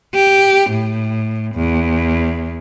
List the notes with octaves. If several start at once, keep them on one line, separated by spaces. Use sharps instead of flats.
G4
A2
E2